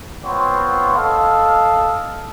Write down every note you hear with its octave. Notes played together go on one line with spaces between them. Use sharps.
B3 C4 F4 C#5
A4 D#5 F5